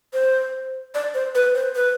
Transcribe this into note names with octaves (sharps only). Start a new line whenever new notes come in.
C5
D5
C5
B4
C5
B4